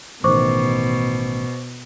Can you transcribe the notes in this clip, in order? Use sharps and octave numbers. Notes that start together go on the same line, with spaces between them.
A1 B2 D#3 C5 C#6 D6